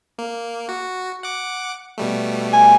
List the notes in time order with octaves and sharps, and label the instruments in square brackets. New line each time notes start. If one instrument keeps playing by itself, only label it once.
[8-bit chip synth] A#3
F#4
F#5 D6
B2 G3 A3
[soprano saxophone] G#5